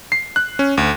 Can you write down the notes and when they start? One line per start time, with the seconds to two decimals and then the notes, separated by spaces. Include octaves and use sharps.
0.12 C7
0.36 F#6
0.59 C#4
0.77 D2